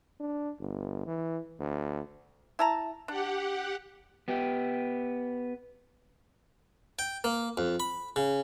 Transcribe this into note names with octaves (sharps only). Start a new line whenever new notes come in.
D4
G1
E3
D2
E4 A5 A#5
D4 G4 F#5
B3 G4
G5
A#3
F2
B5
C#3